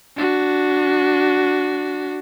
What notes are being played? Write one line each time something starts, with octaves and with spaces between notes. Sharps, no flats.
D4 F#4